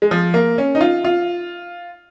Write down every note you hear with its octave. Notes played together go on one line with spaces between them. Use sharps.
G#3
F3
A#3
C#4
D#4
F4
F4